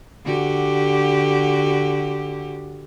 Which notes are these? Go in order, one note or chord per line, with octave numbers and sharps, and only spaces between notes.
D3 F#4 G4